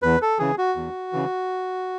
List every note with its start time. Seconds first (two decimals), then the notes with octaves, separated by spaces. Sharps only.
0.02 E2 B4
0.22 A4
0.39 C#3 E3 G#4
0.58 F#4
0.76 E2
1.13 C#3 E3